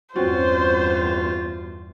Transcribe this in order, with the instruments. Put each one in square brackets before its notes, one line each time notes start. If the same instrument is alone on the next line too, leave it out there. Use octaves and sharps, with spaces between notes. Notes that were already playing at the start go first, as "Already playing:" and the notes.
[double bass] E2 G2 [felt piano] C4 C#4 F#4 [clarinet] F4 [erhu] C5